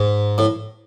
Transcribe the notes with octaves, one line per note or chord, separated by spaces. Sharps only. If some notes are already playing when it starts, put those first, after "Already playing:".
Already playing: G#2
A2